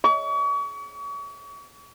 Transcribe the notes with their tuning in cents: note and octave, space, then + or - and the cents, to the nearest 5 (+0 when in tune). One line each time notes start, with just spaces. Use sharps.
C#6 +40